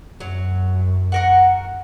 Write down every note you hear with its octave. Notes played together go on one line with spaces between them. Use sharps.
F#2 F#3
F#4 A#4 F#5